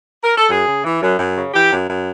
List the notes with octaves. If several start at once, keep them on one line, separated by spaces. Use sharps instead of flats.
A#4
A4
F#2 G#4
C#3
E3
F#2
F#2
C#3
E3 G4
F#2
F#2